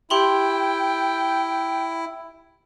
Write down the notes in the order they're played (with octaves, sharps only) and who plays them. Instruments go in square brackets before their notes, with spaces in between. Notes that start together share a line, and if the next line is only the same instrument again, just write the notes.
[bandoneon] E4 [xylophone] G4 C6 F#7 [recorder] G5